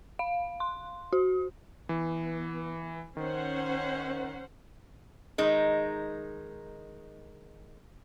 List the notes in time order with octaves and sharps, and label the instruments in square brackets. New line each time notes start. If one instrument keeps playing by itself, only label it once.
[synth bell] F5
C6
F#4
[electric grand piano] E3 [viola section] B3
[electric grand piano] D#3 [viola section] C#4 C5 F#5
[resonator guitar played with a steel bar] D#3 G#3 D#4